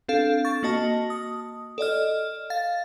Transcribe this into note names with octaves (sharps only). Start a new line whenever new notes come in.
C4 D4 A4 F5
C#6 A6
A#3 F#4 D#5 A5
D#6
A4 D5 D#5 F6
F5 A6